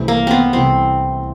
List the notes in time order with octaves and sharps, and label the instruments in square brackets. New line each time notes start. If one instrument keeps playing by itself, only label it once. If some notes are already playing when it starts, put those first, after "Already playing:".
Already playing: [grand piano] C2 C3 E3 A3
[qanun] A#3
B3 C4
[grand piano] C2 C3 E3 A3 [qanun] C4